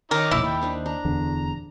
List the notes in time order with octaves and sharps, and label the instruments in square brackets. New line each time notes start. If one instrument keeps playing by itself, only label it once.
[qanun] D#3 [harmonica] D#4 C#5 D6 [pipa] A#4
[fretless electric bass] E1 A#1 D#2 [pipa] E4
[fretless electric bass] D#2 [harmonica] G5 B5
[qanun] D4 D#4 C5
[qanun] D4 [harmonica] A#5
[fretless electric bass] D1 E2 D3